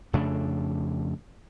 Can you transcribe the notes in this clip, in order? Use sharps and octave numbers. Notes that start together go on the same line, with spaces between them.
F2 C#3 A3 D4